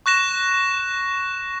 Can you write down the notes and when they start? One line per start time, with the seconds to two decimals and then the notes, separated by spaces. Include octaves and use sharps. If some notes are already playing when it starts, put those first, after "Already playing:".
0.06 C#6 F#6 A#6 E7